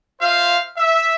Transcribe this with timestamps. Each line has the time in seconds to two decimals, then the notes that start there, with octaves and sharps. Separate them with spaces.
0.21 F4 C5 E5 F5
0.77 E5